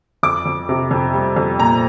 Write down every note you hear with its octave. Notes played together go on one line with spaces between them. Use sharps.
F2 D6
F2
C3
F2
G3
F2
A#2 A#5